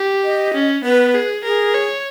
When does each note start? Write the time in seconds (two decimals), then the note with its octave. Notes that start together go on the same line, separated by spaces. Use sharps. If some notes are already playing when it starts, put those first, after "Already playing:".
Already playing: G4
0.24 D#5
0.54 C#4
0.85 B3 B4
1.15 G#4
1.44 G#4 A#4
1.74 C#5